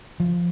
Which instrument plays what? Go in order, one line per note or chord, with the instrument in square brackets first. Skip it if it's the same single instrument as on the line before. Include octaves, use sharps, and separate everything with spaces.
[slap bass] F3